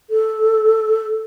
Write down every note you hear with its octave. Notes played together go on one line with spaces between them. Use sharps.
A4